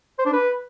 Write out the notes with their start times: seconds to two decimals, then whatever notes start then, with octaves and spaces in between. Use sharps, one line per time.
0.19 C5
0.26 D4
0.33 B4